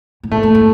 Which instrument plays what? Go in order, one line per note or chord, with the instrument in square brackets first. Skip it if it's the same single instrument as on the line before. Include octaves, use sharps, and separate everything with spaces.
[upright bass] A2
[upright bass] A#2 [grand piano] A3
[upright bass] A2
A2